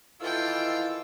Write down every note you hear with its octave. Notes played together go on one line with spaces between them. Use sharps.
D#3 E3 E4 F4 A4 F5 G5 E6